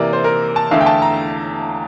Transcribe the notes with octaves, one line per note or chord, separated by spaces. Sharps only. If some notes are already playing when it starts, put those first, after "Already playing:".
Already playing: C3 E3 A#3 D5
C5
A#4
A5
E2 D3 A3 E4 F5
G5
A5
A#5